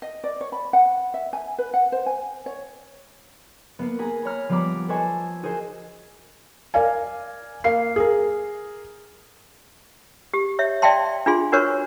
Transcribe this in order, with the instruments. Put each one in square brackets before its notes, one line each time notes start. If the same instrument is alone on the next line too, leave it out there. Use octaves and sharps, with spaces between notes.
[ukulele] D#5
D5
C#5
B5
F#5
E5
G#5
B4
F#5
C5
G#5
C#5
[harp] A#3 B3
G#4 A#5 B5
C#5 A#5 B5 F6
F3 G3 B3 A#5 B5 D6
A4 B4 C5 D#5 G#5 C#6
F#4 G#4 A#4 C5
[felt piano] A#4 D5 F5 G#5
A#3 F5 C7
G#4 A#4
[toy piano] G4
C#5 E5
D5 E5 F5 G5 A5 C6
D4 F4 G#4 C6
D4 F#4 A#4 B4 C#5 C#6